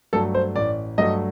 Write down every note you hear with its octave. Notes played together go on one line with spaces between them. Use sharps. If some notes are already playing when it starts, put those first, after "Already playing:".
G2 F#3 A3 A4
C5
A1 D5
G2 F#3 A3 D#5